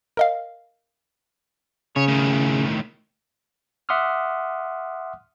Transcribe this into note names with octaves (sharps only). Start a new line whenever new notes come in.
A#4 D#5 F5
C#3 C#5
A2 D#3
E5 F#5 C6 D6 D#6 F6